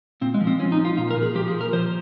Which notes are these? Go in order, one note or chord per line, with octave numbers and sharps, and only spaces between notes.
A#2 C4
G#3
F3
C4
F3 C#4
D#4
F3
F4
A#2 F4
A#4
A#2
G#4
F3 G4
G#4
A#2
A#4
F3 C5